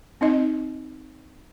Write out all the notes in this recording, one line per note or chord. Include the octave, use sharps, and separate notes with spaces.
C4 D#4 D#5